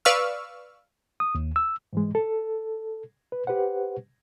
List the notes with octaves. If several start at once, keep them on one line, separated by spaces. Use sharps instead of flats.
B4 D5 F5 C#6 E6 F6
D#6
D#2
E6
G#2 E3 G#3
A4
B4
G4 B4 C5 F#5